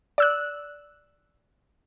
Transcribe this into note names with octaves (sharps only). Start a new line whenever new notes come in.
D5 E6 F#6